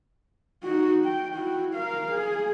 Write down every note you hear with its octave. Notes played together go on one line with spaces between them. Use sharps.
D#4 F#4
G5
E4 F#4
A#4 F5
G#4